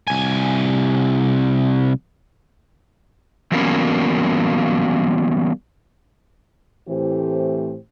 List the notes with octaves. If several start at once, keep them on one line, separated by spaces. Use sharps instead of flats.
C2 G#5
E3 F#3 G3 A#3 B3 C#4
A2 E3 A3 C4 G4 C5